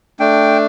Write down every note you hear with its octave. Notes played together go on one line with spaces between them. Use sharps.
A3 D4 G5